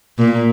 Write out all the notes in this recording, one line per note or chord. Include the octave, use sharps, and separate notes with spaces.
A#2